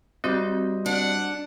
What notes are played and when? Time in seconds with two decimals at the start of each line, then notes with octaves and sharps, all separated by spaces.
0.24 G3 C4 F#4 C5 D#5
0.86 D4 F#5